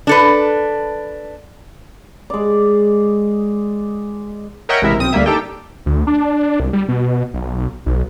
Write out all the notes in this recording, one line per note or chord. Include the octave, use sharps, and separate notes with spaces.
D4 A4 B4
G#3 D5
A#4 C#5 D#5 E5 F#5 G5
A1 C3 G#3 E4 A#4 E5
B1 C4 D#6 D#7
D2 G3 A#3 E5
D4 D#4 G4 A4 G5
D2
D4
C2
G3
B2
B1
B1